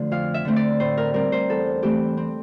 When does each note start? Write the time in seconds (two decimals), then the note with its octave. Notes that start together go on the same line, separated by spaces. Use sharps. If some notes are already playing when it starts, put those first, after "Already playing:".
Already playing: D3 F3 A3
0.11 F2 F5
0.34 E5
0.45 D3 A3 C4
0.56 D5
0.80 A2 C5
0.97 A#4
1.13 G3 C4 A#4
1.32 C5
1.49 E2 A4
1.83 E3 A3 C4 G4
2.17 C4